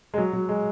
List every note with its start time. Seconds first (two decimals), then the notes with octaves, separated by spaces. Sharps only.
0.14 G#3
0.18 F#3
0.33 F#3
0.49 G#3